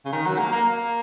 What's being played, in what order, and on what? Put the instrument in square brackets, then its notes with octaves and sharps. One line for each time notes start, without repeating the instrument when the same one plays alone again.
[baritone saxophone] C#3
D#3
F#3
A#3
A#3
A#3